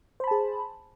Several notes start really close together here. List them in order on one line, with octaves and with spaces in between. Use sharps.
C5 B5 A5 G#4